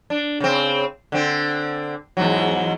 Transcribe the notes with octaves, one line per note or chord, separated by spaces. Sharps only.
D4
C#3 C4
D3 C4
E2 G#2 F#3